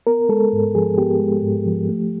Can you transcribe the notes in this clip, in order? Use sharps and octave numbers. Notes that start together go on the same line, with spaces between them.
B3 A#4
G#3 A4
G#2
F3 G#4
B3 G4
G#3
G#2
F3
A3